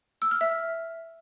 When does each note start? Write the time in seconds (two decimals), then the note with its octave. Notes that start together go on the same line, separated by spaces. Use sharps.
0.22 E6
0.31 F6
0.41 E5